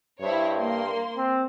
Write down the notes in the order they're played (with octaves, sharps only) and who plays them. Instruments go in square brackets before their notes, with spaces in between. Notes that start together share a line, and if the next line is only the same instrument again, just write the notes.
[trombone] G2 [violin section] E4 C5 C#5
[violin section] A#3 C6
[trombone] C4